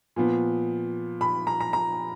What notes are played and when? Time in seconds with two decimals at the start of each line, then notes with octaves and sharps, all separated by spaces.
0.16 A#2 F3 B3
1.21 B5
1.47 A#5
1.60 A#5
1.73 A#5